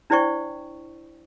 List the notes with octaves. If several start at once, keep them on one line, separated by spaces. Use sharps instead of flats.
D4 E4 C5 D5 G5 C#6